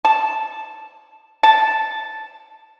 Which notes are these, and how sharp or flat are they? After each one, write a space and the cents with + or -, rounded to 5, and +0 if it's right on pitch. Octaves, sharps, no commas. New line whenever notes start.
A5 -5
A5 -5